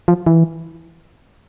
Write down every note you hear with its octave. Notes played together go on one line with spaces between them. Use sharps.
F3
E3